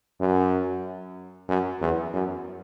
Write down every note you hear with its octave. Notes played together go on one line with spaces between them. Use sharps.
F#2
F#2
E2
F#2